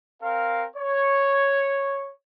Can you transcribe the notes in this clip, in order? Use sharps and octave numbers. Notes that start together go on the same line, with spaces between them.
C4 A#4 F5
C#5